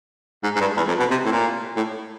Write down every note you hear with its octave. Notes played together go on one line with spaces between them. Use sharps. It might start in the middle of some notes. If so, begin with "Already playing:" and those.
G#2
G#2
G2
E2
F2
B2
C3
A2
A#2
A2